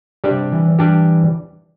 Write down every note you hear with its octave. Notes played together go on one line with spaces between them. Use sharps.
C3 G3 D4 G4 D5
E3
G3 D4 G4 D5